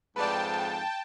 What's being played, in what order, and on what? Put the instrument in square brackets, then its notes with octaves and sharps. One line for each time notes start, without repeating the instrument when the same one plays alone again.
[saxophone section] F2 G#2 [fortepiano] B4 D5 [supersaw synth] G5 A5